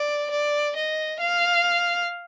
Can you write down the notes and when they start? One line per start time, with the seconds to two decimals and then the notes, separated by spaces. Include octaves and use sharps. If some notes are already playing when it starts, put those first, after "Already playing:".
Already playing: D5
0.30 D5
0.76 D#5
1.20 F5